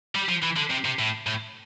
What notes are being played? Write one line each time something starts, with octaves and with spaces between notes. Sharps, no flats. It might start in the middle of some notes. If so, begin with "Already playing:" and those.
G3
F3
E3
D3
C3
C3
A2
A2